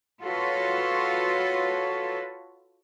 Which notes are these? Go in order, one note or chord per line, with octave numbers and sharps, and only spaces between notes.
F4 F#4 A4 B4 C#5